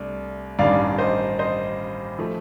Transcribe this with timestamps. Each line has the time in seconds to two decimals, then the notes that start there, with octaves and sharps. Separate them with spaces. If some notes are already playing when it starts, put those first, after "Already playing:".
Already playing: C2 A3 D4
0.59 A1 G2 D#3 D5 F5
0.98 C5 D#5
1.39 C5 D#5
2.19 F3 A3